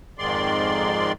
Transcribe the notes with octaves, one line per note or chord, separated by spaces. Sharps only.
F2 G#2 D#3 G#3 D5 C6